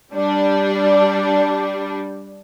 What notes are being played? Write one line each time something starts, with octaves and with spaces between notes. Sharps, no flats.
G3 D4